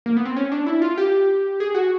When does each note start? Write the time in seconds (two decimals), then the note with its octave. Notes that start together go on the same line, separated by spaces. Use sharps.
0.06 A#3
0.17 B3
0.25 C4
0.37 C#4
0.52 D4
0.67 E4
0.82 F4
0.98 G4
1.60 G#4
1.75 F#4